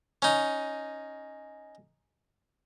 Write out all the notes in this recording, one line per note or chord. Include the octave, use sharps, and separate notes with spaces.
C#4 D#4